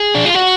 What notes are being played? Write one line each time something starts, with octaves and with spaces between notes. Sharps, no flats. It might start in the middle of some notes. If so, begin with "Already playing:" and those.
Already playing: G#4
D4
F4
F#4